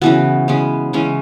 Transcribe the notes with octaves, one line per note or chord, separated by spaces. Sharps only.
C#3 E3 B3 F#4
C#3 G#3 B3
C#3 E3 G#3 C#4